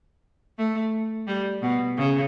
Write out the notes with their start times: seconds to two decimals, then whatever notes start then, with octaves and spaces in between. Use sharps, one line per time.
0.58 A3
1.27 G3
1.62 B2
1.97 C#3